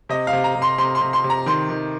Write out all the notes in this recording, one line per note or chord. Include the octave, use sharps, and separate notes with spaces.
C3 D#5
F5
C3
A#5
C3
C6
C3 C6
C6
C3
C6
C3
A#5
D#3 C6
D#3